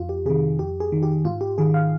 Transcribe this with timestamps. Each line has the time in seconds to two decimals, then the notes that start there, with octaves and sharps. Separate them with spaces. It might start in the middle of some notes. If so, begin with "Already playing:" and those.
Already playing: F2 F4
0.09 G4
0.26 C3 D#3 G#4
0.59 F2 G4
0.80 G#4
0.92 D#3
1.03 G4
1.25 G#2 F4
1.41 G4
1.58 D#3 G#4
1.74 F5